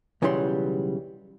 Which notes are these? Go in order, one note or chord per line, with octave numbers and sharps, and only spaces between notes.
B1 C#3 E3 F#3 G3 C6